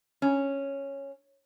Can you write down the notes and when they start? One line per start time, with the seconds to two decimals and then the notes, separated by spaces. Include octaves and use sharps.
0.22 C#4